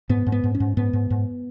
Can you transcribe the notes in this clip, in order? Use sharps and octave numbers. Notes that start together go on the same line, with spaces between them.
G#2 B3
G#2
B3
G#2
C#4
G#2
G#2 B3
G#2
G#2